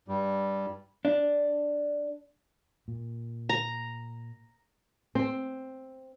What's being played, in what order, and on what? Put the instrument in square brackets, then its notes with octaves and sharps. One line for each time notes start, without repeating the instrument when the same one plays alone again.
[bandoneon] G2 G3
[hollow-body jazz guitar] D4
[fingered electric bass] A#2
[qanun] A#5
[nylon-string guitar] C4